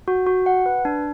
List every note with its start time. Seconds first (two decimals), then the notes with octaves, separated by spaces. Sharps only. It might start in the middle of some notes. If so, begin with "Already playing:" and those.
0.08 F#4
0.26 F#4
0.46 F#5
0.66 B4
0.85 D4